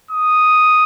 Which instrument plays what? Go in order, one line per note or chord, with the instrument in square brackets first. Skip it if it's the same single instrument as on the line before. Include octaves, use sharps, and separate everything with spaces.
[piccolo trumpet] D#6